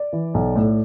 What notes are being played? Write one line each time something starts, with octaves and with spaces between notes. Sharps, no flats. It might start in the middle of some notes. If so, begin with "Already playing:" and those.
Already playing: D5
E3
B1
A2